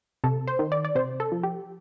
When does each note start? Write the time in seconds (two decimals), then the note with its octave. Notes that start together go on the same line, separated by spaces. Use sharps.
0.24 C3 A4
0.48 C5
0.59 D#3
0.72 D5
0.85 D5
0.95 C3 C5
1.20 A4
1.32 F3
1.43 G4